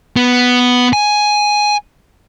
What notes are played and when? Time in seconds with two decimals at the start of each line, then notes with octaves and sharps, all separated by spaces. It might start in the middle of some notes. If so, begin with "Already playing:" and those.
0.16 B3
0.93 G#5